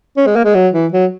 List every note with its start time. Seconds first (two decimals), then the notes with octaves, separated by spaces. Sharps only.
0.17 C#4
0.26 G#3
0.36 A#3
0.45 G#3
0.55 F#3
0.74 E3
0.92 F#3